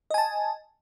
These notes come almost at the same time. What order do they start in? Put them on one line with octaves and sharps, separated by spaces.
D#5 G#5 A5